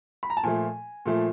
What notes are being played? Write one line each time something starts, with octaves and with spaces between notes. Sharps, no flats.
B5
A#5
A5
A#2 F3 A3 G#5
A#2 F3 A3